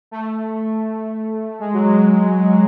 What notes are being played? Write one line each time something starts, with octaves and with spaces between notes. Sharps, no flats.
A3
G#3
F#3
G#3